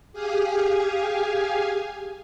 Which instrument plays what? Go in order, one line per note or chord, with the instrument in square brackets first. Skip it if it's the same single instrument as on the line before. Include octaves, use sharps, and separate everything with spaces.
[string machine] G4 G#4 F5 G#5